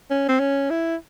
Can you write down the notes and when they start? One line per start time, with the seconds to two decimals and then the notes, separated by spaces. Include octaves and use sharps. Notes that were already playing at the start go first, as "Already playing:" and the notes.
0.11 C#4
0.29 C4
0.40 C#4
0.70 E4